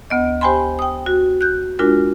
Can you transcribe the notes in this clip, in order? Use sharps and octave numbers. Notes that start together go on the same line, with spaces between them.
D2 B3 D#5
G4 C5 G5 G#5 B5 C6
G5 D#6
F#4
F#6 G6
G#3 D4 F4 F#4 A#4